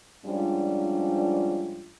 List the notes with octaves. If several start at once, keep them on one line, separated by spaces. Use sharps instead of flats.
G#2 F3 G3 C#4 D4 F4